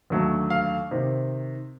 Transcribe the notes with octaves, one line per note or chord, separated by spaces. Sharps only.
D#2 D3 F#3 A3
F5
C3 D#3